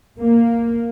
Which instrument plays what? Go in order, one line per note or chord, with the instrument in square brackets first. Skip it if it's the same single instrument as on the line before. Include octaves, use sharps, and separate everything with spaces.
[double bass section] A#3